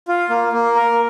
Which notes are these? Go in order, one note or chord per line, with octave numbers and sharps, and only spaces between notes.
F4
A#3
A#3
A#4